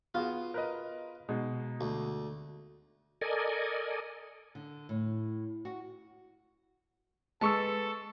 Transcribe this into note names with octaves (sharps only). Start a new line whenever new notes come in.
B3 F4 F#4 G#4
A#4 B4 D#5
B2 G#3 D#4
D2
A4 A#4 D5 D#5 G#5
D3
A2
F#4
G#3 A4 B4 A5 C#6 E6